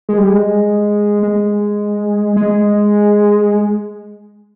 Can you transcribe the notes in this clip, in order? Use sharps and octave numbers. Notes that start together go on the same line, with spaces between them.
G#3
G3
G#3
G#3
G#3